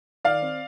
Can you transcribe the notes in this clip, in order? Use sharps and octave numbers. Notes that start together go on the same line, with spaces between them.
D#3 D5 F5
C4